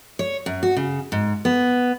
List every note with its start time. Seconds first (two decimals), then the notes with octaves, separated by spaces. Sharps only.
0.19 C#5
0.46 F#2
0.63 F#4
0.77 C#3
1.12 G#2
1.45 B3